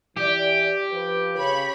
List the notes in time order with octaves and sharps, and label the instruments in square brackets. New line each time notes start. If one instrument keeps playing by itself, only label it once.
[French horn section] E3 D5 [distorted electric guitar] G4
[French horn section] F3 B4
[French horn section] C#3 [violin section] C#5 B5